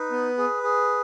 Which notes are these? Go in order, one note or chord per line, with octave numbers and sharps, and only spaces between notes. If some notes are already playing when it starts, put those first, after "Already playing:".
Already playing: D#4 B4
B3
G#4
G#4